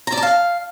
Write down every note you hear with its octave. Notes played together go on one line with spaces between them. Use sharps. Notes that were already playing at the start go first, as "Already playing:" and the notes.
A#5
D5
A5
F5